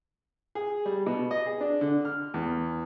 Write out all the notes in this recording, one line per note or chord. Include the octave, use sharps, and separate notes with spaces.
G#4
G3
B2
D#5
G#4
D4
D3
F6
E2